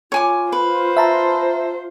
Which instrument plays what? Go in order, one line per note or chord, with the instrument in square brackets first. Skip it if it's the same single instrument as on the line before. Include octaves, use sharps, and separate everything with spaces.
[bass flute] F4 [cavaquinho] C#5 G#5 D6
[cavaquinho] B4 [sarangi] C5
[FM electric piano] E5 A5 A#5